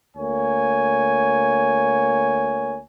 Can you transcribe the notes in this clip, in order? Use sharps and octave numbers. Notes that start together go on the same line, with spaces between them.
D2 A#3 C#5 G#5